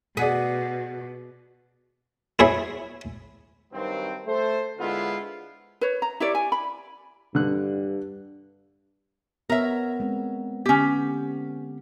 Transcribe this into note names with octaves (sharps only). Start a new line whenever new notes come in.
B2 G#4 D5 F#5 B6
E4 G#4 C#5 E5
G2 D#3 F#3 C4
A3 A4 C5
D3 G#3 B3 E4 F4
B4 C#5
A#5
E4 G4 C#5 D5
G#5
B5
G2 D3 F#6
B3 A#4 C#5 E5
G#3 C4
D3 B3 C#4 G4